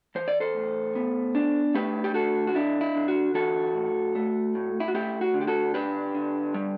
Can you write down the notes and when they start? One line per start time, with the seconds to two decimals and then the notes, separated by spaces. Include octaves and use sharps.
0.15 E3 C5
0.28 D5
0.40 A4 C5
0.55 A2
0.95 B3
1.35 D4
1.75 A3 G4 B4
2.04 G4
2.14 D3 F#4 A4
2.47 F#4
2.55 D4 E4
2.81 E4
2.95 D3
3.08 F#4
3.34 E3 F#4 A4
3.74 A2
4.15 A3
4.55 A2
4.80 E4
4.88 F#4
4.94 A3 E4 G4
5.21 F#4
5.34 D3
5.41 G4
5.47 F#4 A4
5.74 D4 G4 B4
6.14 D3
6.54 G3